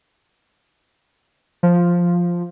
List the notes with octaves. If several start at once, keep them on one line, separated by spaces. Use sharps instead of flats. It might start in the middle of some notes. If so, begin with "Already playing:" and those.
F3